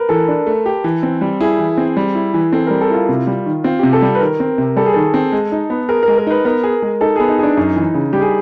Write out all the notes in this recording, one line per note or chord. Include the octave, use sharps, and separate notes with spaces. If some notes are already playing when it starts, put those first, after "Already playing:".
Already playing: A#4 B4
E3 A4
D4
A3
G4
E3
C4
G3
E4 G#4
E3
C4
G3
E4
E3
C4 A4
G3 A#4
A4
E4 F4
C3
G3
D#3
C4 F4
C3 G4
A4
G3
B4
D#3 A#4
C4
C3
G3 A4
G#4
D#3 A4
C4
G#3
D#4
B3
G#4 A#4
A#4
G#3
A#4
D#4 B4
B3 A#4
G#4
G#3
D#4 A4
B3 G#4
D#4
D4 G#4
F#2 D#4
E3
C#3
G3 G4
G#4